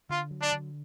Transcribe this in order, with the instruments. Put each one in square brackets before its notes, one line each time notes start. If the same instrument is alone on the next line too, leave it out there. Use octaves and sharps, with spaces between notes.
[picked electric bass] D3 [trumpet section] F4
[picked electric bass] F#3
[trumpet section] D4
[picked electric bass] D3